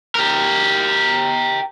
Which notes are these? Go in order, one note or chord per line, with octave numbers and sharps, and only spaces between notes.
G4 A#4